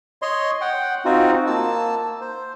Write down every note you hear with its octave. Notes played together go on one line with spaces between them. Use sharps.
C#5 D#5 C6
F#5 G5
C4 D#4 F4 F#4
A#3 A5 E6
C5